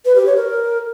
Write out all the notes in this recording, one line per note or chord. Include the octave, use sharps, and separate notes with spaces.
B4
G4
C#5
A#4